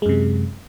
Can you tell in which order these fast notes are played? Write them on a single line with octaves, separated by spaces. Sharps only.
G#3 F#2 C3